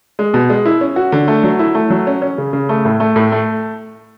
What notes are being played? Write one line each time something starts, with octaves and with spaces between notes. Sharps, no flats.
G#3
B2
G#3
E4
C#4
F#4
D3
A3
F#3
E4
A3
F#3
C#4
C#4
C#3
C#3
A3
A2
A3
A2
A3